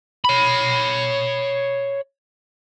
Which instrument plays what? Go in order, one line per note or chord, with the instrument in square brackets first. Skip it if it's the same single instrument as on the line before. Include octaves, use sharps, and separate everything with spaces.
[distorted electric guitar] C#5 B5